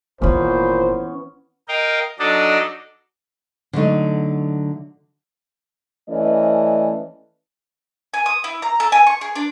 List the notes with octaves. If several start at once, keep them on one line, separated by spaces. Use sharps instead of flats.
G1 A#2 D#3 E3 B3 C#4 C5
A#4 D#5 F5 G5
F#3 D4 D#4 A4 D5 D#5
D3 F#3 A3 D#4
E3 A3 C#4 D5 D#5
G#5
D#6
E4
A#5
A4
G#5
C#6
G#4
D4